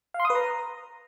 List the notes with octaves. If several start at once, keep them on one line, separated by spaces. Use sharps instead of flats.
F5
C6
D#6
B4
A#5